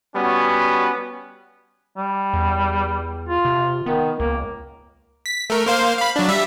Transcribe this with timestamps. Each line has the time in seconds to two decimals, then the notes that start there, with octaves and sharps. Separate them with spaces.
0.15 G3 B3 C#4 F#4
1.96 G3
2.34 E2
3.28 F4
3.45 C3
3.86 D#3 B3
4.20 C#2 A#3
5.26 B6
5.50 A3 A#4
5.66 A#3 C5 F5
5.99 F5 B5
6.16 F#3 D4
6.28 G3 E5